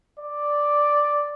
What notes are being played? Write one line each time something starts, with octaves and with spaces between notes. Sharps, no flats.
D5